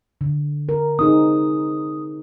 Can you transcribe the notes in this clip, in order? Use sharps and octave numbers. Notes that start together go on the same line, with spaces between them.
D3
A#4
C4 D#4 G#4 D#6